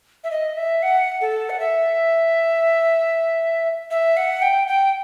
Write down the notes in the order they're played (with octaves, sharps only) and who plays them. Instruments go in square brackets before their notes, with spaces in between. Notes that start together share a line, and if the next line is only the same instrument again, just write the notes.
[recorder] E5
D#5
E5
F#5
A4
F#5
E5
E5
F#5
G5
G5